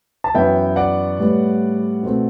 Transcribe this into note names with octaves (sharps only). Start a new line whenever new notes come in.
A5
F#2 E3 B3 E5 G5
D5 F#5
A2 G3 B3
B2 A3 C4